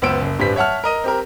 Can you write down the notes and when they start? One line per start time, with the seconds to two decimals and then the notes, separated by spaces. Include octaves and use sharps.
0.02 C#2 F#2 B3 C5 E6 D7
0.22 F#1
0.39 D1 G2 G3 B4 C5 B6
0.56 C#5 E5 F#5 A5 F6
0.84 A#4 D#5 D#7
1.04 C4 G4 A#4